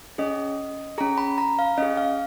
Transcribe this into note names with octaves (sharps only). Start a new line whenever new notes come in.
C#4 G#4 D#5
C#4 G#4 A#5
B5
A#5
F5
C#4 G#4 D#5
F5